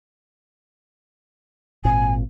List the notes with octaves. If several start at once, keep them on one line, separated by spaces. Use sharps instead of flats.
G#1 A#2 C4 G#5